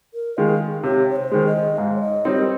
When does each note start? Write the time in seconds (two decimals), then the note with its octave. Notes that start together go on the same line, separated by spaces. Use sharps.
0.14 A#4
0.37 D#3 G#3 F5
0.83 C3 C#5
1.09 C#5
1.16 C5
1.32 D#3 G#3
1.47 D#5
1.77 G#2 F5
1.95 C#5
2.01 D#5
2.25 G3 C4 D#4 C#5
2.37 A#4